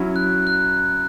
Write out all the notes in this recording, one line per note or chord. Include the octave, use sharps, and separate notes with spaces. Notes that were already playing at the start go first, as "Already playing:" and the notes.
Already playing: F#3 C#4 E4
F#6
F#6